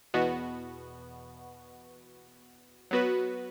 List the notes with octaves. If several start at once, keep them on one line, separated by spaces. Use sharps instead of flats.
E2 B2 B3 F#4
F#3 B3 F#4 B4